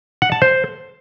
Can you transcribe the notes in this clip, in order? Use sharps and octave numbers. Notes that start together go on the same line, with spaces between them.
F#5
A5
C5